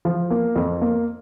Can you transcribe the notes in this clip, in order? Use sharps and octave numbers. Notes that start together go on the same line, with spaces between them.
F3
A#3
F2
A#3